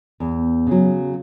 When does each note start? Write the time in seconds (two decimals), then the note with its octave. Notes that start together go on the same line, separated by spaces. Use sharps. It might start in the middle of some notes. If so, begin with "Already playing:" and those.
0.20 E2
0.67 C#3 F#3